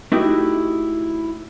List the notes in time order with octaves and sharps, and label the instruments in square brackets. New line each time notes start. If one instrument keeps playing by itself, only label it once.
[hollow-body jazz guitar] A3 D#4 E4 F#4 G4